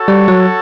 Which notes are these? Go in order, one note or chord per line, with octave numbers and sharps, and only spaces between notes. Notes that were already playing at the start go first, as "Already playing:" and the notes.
Already playing: F#4 A4 C#5
G3
F#3